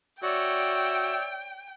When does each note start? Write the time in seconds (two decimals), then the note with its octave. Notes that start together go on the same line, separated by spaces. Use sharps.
0.23 F#4 C#5 D5 E5 G5